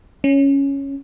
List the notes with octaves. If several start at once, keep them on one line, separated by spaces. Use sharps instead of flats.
C#4